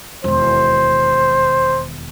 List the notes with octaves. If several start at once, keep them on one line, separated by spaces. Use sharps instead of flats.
E1 D#2 C5